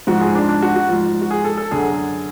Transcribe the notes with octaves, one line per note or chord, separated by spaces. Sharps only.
G#2 F3 F#4
G#4
D4
D4
F#4
F#4
G#2 F3 F4
F#4
G#4
A4
A4
F#2 D3 F#3 G#4